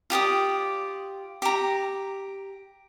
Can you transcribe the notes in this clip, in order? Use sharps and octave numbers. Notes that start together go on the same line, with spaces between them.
F4 G4 D5 D#6
G4 A#5